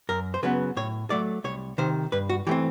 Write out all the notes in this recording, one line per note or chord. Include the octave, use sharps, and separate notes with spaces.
F#2 A#4
C5
C#3 F#3 B3 B4
A2 C#5
F#3 A3 D5
C2 C#5
C3 D#3 C5
G2 B4
F#4
E3 A3 C4 G4